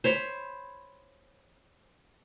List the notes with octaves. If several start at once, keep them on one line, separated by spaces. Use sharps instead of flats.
C5 C#5 B5